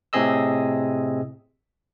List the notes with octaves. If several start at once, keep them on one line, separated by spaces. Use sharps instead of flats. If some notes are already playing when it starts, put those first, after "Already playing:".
A2 C3 C4 G#4 D#5 E6